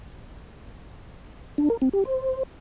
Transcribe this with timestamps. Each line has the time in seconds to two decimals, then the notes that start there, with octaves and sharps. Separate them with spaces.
1.58 D4
1.70 A#4
1.82 C4
1.93 G4
2.05 C5